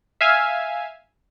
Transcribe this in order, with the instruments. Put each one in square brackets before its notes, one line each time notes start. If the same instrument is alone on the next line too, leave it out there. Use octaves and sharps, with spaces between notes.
[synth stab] E5 F5 G#5